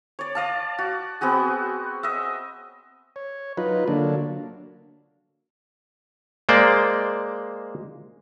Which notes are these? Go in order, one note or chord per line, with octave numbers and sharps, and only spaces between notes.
C#5 D5
D5 F5 A5
F#4
B3 C4 F#4 G#4
D#5 E5
C#5
F#3 D#4 F4 B4
D3 F#3 A#3 D4
G#3 A#3 C5 D5